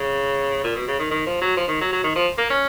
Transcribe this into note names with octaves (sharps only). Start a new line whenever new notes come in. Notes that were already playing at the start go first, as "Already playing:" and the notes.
Already playing: C#3
A#2
B2
C#3
D#3
D#3
F3
F#3
F3
D#3
F#3
F#3
D#3
F3
A#3
C#4